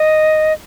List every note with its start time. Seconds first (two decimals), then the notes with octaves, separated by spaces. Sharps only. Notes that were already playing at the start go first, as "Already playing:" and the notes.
Already playing: D#5